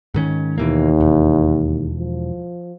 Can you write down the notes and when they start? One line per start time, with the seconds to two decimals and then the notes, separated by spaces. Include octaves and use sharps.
0.14 G#2 D#3 C#4
0.58 D#2 B2 E3 A#3
1.01 E1
1.98 F3